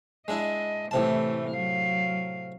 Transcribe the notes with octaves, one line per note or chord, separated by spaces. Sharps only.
G#3 D4 E4 D#5
A2 C3 E3 A3 A5
F#3 F5